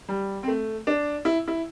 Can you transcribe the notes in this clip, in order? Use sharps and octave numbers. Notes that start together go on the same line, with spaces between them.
G3
C4
A3
D4
E4
E4